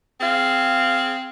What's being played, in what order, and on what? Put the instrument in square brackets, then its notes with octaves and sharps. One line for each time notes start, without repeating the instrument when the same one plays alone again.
[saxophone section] C4 G#4 F5